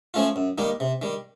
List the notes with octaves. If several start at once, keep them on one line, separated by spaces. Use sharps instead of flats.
F3 A3 C#4 F4
F#2
D#3 G3 A#3 D#4
C3
D#3 G3